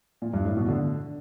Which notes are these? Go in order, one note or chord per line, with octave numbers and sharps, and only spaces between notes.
A#2
G2
A2
B2
D3